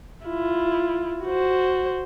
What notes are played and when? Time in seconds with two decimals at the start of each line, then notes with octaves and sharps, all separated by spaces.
0.25 E4 F4
1.24 F#4 C5